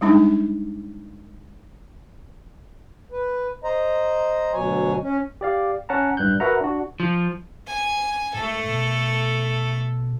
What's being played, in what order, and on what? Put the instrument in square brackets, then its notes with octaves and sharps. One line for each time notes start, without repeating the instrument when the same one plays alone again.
[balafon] G3 G#3 D4 D#4
[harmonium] B4
C5 D#5 A#5
D2 B2 F#3 C#5 G#5
C#4
[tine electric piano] G4 D5 F5
C#4 F#5 A5 A#5
A1 G2 G3 F#6 G6
F#4 A#4 B4 E5 F#5 A#5
D4 F#4
[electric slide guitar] F3
[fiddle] G#5
[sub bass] G#2 [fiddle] A3 A4
[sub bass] B2